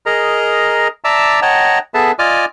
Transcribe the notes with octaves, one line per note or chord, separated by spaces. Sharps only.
G#4 A#4 D#5 A#5
D5 E5 A5 A#5 D6 E6
C#5 D#5 F#5 G5 A5 A#5
B3 G#4 A4 B4 E5 A5
F4 D5 D#5 G#5 D6 F6